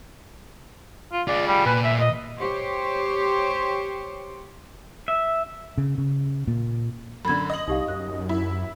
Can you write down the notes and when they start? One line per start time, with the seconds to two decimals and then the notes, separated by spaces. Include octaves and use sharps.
1.12 F4
1.28 F4 G#4 D5
1.47 G3
1.66 A#2 B4 G#5
1.84 E5
2.00 D#5
2.38 G4 C5 C#5
5.08 E5
5.78 C#3
5.98 C#3
6.47 A#2
7.25 F#2 D3 B5 G#6
7.50 D#5 D#6 F#7
7.68 C2 D#4 G4 F5
7.88 F#2 F#6
8.29 E4